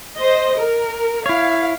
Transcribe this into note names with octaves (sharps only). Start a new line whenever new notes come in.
C5 D#5
A#4
E4 C#5 F5